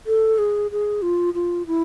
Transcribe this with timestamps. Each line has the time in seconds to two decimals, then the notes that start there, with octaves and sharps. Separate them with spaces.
0.07 A4
0.38 G#4
0.71 G#4
1.02 F4
1.34 F4
1.67 E4